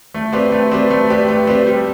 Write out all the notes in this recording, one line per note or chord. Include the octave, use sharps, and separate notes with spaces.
A3
C4 G4 B4 D5
A3
C4 G4 B4 D5
A3
C4 G4 B4 D5
A3
C4 G4 B4 D5
G3